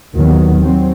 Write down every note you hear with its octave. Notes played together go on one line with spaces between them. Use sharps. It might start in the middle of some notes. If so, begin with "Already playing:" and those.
D#2 D#3 F#3 B3
F#3 C4